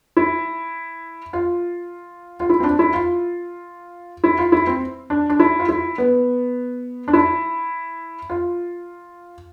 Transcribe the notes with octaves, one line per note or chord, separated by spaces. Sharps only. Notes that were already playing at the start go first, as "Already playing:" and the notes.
E4
F4
F4
E4
C4
D4
E4
F4
E4
F4
E4
C4
D4
D4
E4
F4
E4
B3
D4
E4
F4